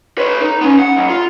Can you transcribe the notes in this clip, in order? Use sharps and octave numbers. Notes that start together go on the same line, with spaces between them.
B4 C#5
D#4
B3 C#4
F#5
B1
F4